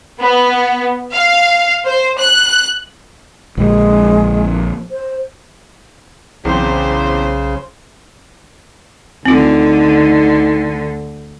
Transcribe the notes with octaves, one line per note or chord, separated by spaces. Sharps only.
B3
F5
C5
F#6
A#1 D3 G#3
C5
B1 E2 C#3 C4 C5
D2 D3 C4 D#4 F4